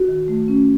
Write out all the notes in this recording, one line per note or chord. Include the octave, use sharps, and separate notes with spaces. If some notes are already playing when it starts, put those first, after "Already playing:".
Already playing: F#4
D#3
A3
C#4